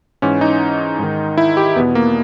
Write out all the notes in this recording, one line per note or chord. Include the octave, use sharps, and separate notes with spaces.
G#2 E3 C#4
D#4
G#2 D#3
E4
G4
E2 B2 B3
A#3